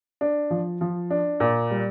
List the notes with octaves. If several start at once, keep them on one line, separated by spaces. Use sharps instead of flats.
D4
F3
F3
D4
A#2
G3